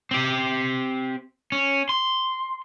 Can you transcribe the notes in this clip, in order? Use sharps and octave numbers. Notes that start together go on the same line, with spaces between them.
C4 G4
C#4
C6